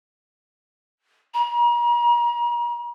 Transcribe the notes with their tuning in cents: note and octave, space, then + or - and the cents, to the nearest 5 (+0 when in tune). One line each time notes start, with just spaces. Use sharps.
A#5 +40